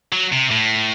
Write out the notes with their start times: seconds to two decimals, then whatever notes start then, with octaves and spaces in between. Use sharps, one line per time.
0.12 F#3
0.32 C3
0.51 A2